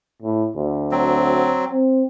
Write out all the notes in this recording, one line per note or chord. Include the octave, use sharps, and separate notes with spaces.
A2
D2
F#3 C4
C4